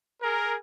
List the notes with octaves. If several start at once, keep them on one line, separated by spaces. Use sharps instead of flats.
G#4 A#4